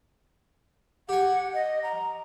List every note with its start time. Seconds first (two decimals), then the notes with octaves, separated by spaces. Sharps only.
1.09 G4 F#5 G#5
1.54 D#5
1.83 A#5